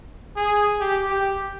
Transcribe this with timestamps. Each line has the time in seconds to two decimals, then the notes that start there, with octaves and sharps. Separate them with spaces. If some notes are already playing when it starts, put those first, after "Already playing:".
0.36 G#4
0.81 G4
1.10 G4